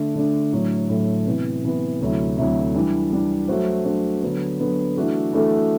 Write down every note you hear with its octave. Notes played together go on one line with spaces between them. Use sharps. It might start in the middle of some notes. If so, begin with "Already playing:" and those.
Already playing: D3 A3 D4
D3 A3 D4
A2 F#3 A3 D4
A2 F#3 A3 D4
C3 E3 B3
C3 E3 B3
D2 C3 F#3 A3 E4
D2 C3 F#3 A3 E4
E3 G3 D4
E3 G3 D4
F#3 A3 D4 F#4 C5
F#3 A3 D4 F#4 C5
D3 F#3 B3
D3 F#3 B3
E3 A3 D4 F#4 A4
E3 A3 D4 F#4 A4